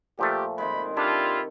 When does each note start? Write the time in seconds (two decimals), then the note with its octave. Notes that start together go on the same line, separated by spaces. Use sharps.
0.19 A#2 F3 A3 G4
0.58 C3 D#3 G#3 B5
0.97 D4 E4 F4 G4 A4